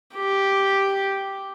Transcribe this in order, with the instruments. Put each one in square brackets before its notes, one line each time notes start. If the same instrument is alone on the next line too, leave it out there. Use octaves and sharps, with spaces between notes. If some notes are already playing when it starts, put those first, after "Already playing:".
[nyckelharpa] G4